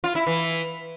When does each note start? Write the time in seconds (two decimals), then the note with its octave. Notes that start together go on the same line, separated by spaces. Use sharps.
0.04 F4
0.15 E4
0.27 E3